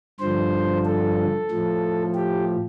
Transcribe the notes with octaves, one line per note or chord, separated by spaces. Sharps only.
G2 D3 F3 C5
A4
A2 F3
G4